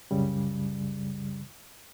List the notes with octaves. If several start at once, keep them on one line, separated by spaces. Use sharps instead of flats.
C2 F#2 C#3 G3